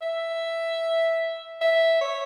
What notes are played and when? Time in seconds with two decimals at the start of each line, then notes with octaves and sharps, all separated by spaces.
0.01 E5
1.61 E5
2.01 C#5